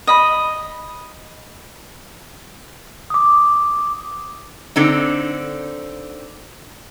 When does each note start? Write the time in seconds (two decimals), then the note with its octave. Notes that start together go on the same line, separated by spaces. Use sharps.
0.07 D#5 B5
3.10 D6 D#6
4.76 D3 C4 D#4